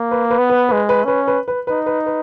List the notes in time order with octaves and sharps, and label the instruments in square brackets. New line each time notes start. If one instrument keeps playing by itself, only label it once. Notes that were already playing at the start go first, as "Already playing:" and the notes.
Already playing: [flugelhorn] A#3
[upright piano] B4
B4
[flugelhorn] B3
[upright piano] B4
[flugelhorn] G#3 [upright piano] B4
[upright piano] B4
[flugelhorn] C#4 [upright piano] B4
[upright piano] B4
B4
[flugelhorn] D#4 [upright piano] B4
[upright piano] B4
B4